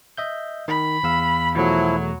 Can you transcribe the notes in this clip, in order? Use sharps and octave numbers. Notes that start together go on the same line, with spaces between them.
D#5 E5 G6
D#3 B5
E2 F5 E6
E2 B2 F3 F#3 A3 E4